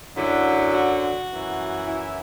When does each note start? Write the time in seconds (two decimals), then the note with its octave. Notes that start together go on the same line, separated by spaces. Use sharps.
0.16 F#2 D3 F#3 E4
0.73 F#4
1.30 F#2 E3
1.87 E4